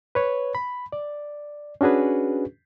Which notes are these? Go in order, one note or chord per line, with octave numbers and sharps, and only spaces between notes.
B4 C#5
B5
D5
C#4 D4 F#4 G#4 B4